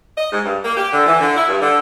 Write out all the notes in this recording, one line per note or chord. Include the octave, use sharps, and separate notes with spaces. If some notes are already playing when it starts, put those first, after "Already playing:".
D#5
G#2
G2
A#3
G4
D3
E3
D3
E4
G2
D3